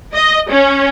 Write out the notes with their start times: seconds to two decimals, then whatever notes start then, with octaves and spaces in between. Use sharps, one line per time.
0.14 D#5
0.50 C#4